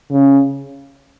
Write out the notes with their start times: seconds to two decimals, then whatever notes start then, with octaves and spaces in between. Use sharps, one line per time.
0.10 C#3